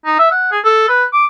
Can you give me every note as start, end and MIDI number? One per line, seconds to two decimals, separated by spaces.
0.05 0.17 63
0.19 0.30 76
0.31 0.48 78
0.52 0.59 68
0.64 0.85 69
0.89 1.04 71
1.13 1.25 86